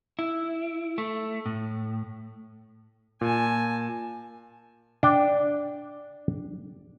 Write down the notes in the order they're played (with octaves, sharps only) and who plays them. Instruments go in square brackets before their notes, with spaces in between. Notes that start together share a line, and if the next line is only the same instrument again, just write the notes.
[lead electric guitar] E4
A3
A2
[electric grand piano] A#2 [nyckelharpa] G#5 A5
[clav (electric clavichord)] D4 G5